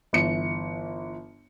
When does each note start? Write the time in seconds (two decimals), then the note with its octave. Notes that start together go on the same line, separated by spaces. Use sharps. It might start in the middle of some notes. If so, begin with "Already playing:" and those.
0.13 G1 E3 C#7